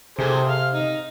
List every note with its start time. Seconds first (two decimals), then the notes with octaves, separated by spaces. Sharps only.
0.19 C3 G#4 A4 C5
0.49 F5
0.73 D#4